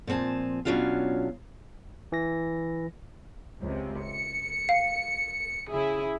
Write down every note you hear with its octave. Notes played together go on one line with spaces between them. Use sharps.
A#2 F3 C4 G#5 A5
B2 F#3 C#4 D4 F4 F5
E3 A#6
C#2 C3
C#7
F5
C#3 E4 G#4